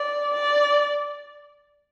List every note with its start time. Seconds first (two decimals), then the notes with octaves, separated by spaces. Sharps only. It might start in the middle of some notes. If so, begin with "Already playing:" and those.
Already playing: D5
0.34 D5